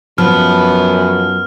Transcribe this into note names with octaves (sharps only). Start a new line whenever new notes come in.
F#2 F3 B3 F6